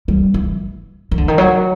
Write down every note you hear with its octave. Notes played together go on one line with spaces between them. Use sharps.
G3
E3
D#3
D3
D#3
F#3